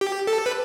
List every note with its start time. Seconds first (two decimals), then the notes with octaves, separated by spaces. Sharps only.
0.01 G4
0.27 A4
0.46 B4